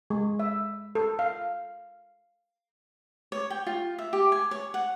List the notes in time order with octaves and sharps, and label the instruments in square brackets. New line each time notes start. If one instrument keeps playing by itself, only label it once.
[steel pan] G#3
E5
A4
F5
[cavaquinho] C#5
G5
F4
E5
G4
G#5
C#5
F#5